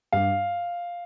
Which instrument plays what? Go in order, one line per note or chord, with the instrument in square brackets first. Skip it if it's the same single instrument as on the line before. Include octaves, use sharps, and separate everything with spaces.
[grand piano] G2 F5